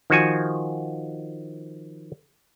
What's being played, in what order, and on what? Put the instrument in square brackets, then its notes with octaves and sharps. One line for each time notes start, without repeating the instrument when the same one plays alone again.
[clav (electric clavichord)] D#3 F3 F#4 G#5